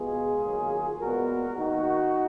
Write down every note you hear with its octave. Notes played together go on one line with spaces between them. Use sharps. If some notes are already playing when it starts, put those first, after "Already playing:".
Already playing: B2 G#3 B3 F4 G#4
D#3 F#3 A#3
A#2 G#3 B3 F#4 A#4
D#3 A#3 D#4 F#4